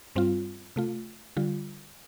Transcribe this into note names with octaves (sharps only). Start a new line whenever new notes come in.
G2 G3 C4 F4
C3 A3 F4
D3 G3 F4